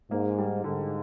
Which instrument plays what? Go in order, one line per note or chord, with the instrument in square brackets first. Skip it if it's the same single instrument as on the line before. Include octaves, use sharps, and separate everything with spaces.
[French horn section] G#2 [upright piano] A#3
[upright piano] G3
[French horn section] G#2 [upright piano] D3